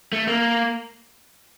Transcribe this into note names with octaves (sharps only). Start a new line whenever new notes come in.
A3
A#3